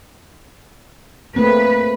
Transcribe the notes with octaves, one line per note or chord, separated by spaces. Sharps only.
A3 A#3 C4 B4